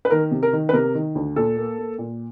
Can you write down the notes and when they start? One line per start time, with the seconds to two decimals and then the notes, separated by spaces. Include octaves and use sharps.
0.05 B4
0.10 D#3 A#4
0.31 C3
0.43 A#4
0.53 D#3
0.69 B4
0.73 C3 A#4
0.95 D#3
1.15 D2
1.36 A#2 A4
1.57 A#3
1.78 A#3
1.98 A#2